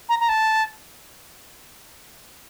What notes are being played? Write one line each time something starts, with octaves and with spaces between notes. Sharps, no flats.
A#5
A#5
A5